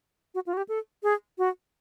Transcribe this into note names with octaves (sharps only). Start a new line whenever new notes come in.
F#4
F4
F#4
G4
A4
G#4
F#4